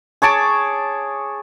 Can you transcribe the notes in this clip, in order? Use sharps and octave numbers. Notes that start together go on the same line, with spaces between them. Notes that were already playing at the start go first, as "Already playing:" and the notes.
G#4 C#5 A5 D6